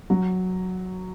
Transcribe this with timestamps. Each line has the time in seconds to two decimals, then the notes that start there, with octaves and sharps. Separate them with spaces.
0.10 F#3